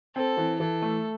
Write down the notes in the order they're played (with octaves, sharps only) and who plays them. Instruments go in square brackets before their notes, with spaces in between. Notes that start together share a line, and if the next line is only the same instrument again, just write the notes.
[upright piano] C4 [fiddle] A4
[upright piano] E3
[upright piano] E3 [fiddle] A4
[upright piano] A3